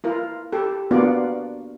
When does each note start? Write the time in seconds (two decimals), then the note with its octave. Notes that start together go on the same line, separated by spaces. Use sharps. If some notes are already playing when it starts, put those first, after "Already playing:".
0.04 E4 F4 A#4
0.52 G4 A4
0.91 A#3 B3 D4 F4 F#4 D5